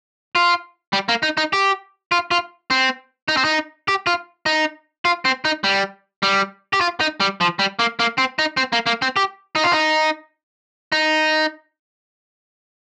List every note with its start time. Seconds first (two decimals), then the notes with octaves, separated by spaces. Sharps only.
0.35 F4
0.93 G3
1.09 A#3
1.23 D#4
1.37 D#4
1.53 G4
2.12 F4
2.31 F4
2.70 C4
3.28 D#4
3.37 C4
3.45 D#4
3.88 G4
4.07 F4
4.46 D#4
5.05 F4
5.25 C4
5.45 D#4
5.64 G3
6.23 G3
6.73 G4
6.81 F4
7.00 D#4
7.20 G3
7.41 F3
7.59 G3
7.79 A#3
7.99 A#3
8.18 C4
8.39 D#4
8.57 C4
8.73 A#3
8.86 A#3
9.02 C4
9.16 G4
9.55 D#4
9.64 F4
9.73 D#4
10.92 D#4